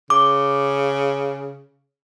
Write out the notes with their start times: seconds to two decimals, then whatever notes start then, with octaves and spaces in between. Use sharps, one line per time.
0.10 C#3 D6